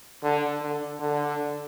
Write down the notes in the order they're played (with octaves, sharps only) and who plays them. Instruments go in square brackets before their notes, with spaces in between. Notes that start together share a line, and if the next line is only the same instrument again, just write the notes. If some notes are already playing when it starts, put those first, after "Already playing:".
[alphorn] D3
D3
D3